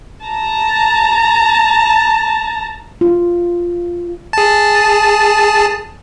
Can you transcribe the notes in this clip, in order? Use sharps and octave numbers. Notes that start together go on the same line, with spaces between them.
A5 A#5
F4
G#4 A5